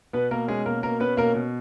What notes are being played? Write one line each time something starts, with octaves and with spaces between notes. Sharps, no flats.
B2 B3 B4
B2 A#3 A#4
G#3 C#4 G#4
B2 A#3 A#4
B2 A#3 A#4
B3 C#4 B4
B2 A#3 A#4
B2